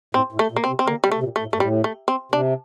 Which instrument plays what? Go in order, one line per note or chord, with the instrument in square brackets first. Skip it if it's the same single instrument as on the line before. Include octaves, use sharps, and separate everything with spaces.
[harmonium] A2 [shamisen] C4
[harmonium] A2
[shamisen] A3
[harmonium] A#2
[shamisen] A#3
C4
[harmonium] C3
[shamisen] C4
[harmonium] D3 [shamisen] A#3
[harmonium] C3 [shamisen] G3
[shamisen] A3
[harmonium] C3
A#2
[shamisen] A3
[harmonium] A2
[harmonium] G2 [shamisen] A3
[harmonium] A2 [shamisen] G3
[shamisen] A3
C4
[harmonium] C3 [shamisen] D4